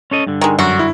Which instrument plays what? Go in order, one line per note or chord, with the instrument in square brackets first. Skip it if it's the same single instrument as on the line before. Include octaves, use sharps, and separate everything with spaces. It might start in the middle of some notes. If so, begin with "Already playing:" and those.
[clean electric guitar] C#4 A4 D#5
G2 D3
[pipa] D#3 G#3
[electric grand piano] F#2 [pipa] F#4
[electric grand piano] E4